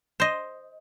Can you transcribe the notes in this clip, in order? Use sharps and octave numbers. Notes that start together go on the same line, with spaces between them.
C5 D#5